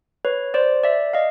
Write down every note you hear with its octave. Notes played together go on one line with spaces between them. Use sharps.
B4 C#5
C5 D5
D5 E5
D#5 F5